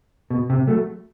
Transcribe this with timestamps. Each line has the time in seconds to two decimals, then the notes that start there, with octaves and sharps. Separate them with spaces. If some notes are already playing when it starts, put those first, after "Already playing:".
0.30 B2
0.50 C3
0.67 F#3 A3